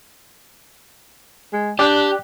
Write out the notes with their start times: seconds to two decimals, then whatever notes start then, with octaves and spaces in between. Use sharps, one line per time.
1.53 G#3
1.79 D4 G4 D5 F#6